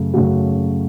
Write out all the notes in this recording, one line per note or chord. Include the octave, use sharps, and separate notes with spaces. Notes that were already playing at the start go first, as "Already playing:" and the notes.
Already playing: F#2 C#3 A3
F#2 C#3 A3 F#4